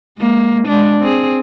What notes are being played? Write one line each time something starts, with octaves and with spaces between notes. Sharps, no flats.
G#3 A#3
G#3 D4
C4 G#4